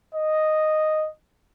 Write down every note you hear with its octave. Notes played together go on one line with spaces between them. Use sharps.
D#5